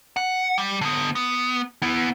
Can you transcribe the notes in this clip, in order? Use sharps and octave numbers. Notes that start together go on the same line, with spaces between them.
F#5
G3
D3 B3
B3
B3 E4